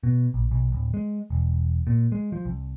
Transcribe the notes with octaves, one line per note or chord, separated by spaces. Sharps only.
B2
A#1
B1
D1
G#3
E1
A#2
G#3
F3
C2